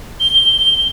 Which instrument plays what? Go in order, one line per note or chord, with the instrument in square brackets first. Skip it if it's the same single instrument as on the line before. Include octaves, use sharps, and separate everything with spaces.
[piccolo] G7